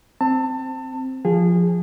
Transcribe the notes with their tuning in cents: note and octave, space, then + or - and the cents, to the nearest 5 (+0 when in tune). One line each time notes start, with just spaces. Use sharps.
C4 +0 A5 +30
F3 +0 G#4 -25